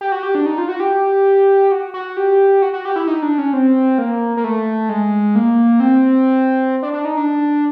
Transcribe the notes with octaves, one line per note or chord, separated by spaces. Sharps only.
G4
F#4
G4
D4
D#4
F4
F#4
G4
F#4
F#4
G4
F#4
F#4
G4
E4
D#4
D4
C#4
C4
A#3
A#3
A3
G#3
A#3
C4
D4
D4
D#4
D4